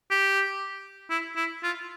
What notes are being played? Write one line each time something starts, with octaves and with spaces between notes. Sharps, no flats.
G4
E4
E4
F4